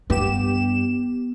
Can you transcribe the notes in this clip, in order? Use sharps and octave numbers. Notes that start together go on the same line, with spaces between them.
G2 B3 G4 E7